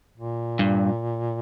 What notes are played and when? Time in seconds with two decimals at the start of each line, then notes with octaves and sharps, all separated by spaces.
0.17 A#2
0.59 G2